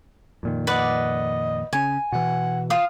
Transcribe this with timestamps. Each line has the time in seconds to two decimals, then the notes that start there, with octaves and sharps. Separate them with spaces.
0.43 F2 A#2 D#3
0.67 B4 D5 D#5 F#5
1.73 C#3 C#4 G#5
2.12 B2 E3 F#5
2.70 F4 F5 D#6